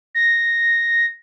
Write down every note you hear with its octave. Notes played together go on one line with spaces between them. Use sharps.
A#6